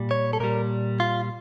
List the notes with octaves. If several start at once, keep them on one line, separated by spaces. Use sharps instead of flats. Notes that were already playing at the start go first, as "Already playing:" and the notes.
Already playing: A#2 G3
C#5
A4
A#2 G3 A#4
F4